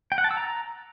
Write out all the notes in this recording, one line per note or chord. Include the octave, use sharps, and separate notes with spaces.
G5
F#5
A5
E6
A#5